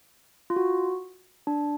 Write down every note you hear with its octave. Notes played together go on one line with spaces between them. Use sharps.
F4
F#4
D4